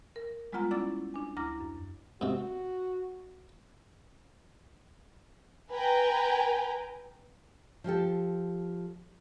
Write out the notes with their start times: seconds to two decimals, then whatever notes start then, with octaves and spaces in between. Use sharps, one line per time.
0.16 A#4
0.52 G3 G#3 B3 F4 F#5 A#5
0.71 C#4 E4 D5 F#5 D6 A6
1.14 D4 G#5
1.37 D2 E4 A#5 D6 F6 A#6
1.60 F#2
2.21 G#2 C3 F#4
5.74 B4 G5 G#5 A#5
7.84 F3 F4 G4 A4